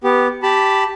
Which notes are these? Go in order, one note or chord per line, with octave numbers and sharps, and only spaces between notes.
B3 G4
G4 A5 B5